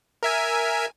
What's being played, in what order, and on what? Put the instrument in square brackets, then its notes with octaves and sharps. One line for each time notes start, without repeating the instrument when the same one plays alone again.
[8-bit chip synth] A#4 E5 G#5